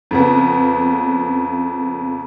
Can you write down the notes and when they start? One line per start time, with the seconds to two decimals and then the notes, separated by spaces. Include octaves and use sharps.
0.11 F2 C#3 B3